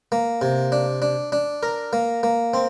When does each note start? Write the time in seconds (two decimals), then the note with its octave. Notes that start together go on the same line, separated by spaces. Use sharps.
0.12 A#3
0.42 C3
0.72 D4
1.02 D4
1.32 D4
1.63 A#4
1.93 A#3
2.23 A#3
2.54 C4